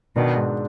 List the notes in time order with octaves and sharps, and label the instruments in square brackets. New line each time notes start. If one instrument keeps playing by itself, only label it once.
[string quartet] B2 D#3 [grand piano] D4
[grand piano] G#2